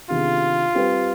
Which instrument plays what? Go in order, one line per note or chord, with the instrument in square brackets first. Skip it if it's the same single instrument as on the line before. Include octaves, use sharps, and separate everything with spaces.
[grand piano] C3 D#3 B3 D4 G#4 [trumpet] F4
[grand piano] G3 C4 G4 B4